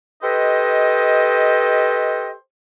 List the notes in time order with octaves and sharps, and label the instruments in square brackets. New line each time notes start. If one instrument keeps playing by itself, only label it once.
[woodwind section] G4 A4 B4 C5 D#5